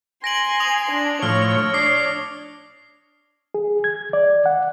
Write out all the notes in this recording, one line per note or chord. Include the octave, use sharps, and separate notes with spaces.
G#5 C6 A#6 D7 F#7
D#6 F7 F#7
D4
A2 F3 C#5 F6
D4 D#6 C7
G#4
G#6
D5
F#5